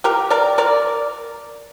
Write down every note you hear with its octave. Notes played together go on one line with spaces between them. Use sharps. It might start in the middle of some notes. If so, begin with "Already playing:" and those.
G4 A#4
A#4 D5
A#4 D5